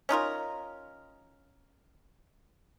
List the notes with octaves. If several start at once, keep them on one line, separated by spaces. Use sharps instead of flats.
C#4 D#4 F4 A#4